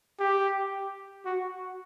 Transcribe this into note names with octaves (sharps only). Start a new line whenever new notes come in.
G4
F#4